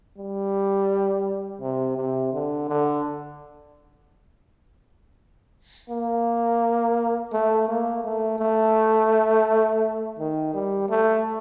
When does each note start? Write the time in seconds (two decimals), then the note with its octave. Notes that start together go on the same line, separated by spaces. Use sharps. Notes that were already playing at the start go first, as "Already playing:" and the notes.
0.18 G3
1.61 C3
1.97 C3
2.33 D3
2.69 D3
5.90 A#3
7.33 A3
7.68 A#3
8.04 A3
8.39 A3
10.19 D#3
10.54 G3
10.90 A3